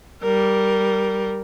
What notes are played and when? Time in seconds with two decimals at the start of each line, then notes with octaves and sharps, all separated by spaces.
0.22 G3 A#4